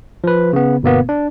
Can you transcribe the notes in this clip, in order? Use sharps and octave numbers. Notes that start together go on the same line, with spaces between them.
F3 B4
C#3 B3
G1 B2 A#3 B3
D4